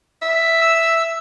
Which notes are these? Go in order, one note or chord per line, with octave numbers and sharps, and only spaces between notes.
E5
E6